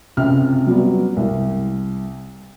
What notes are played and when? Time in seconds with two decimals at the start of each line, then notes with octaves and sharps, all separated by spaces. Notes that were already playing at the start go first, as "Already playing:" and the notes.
0.17 C#2 C3 C4 C#4 F6
0.67 F#3 G3 B3
1.17 C2